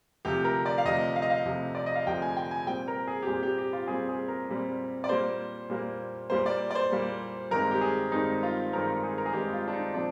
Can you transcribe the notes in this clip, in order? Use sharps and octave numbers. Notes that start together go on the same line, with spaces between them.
D2 C3 F3 G4
A#4
D5
F5
D2 C3 F3 D#5
F5
D#5
F5
D2 C3 F3
D5
D#5
F5
D2 C3 F3 G5
G#5
G5
G#5
A#2 G3 C4 G5
A#4
G#4
G4
A#2 G3 C4 G#4
G4
G4
F4
A#2 G3 C4 G#4
G#4
A#4
A#2 G3 C4
D5
A#2 G3 A#3 C5
A#2 G3 A#3
A#2 G3 A#3 C5
D5
D5
C5
A#2 G3 A#3
G2 D#3 G#3 C4 A#4
G4
G#4
G2 D#3 G#3 C4 D#4
F4
G2 D#3 G#3 C4 A#4
G#4
A#4
G#4
G2 D#3 G#3 C4 G4
F4
D4
D#4
A#2 F3 C4 D4